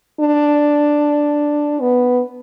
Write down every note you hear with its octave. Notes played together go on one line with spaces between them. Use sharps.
D4
B3